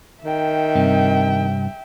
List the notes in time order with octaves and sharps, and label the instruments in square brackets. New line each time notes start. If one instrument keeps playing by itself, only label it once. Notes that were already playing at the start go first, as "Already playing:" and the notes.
[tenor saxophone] D#3 [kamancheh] E5 G5
[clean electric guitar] G2 C3 C4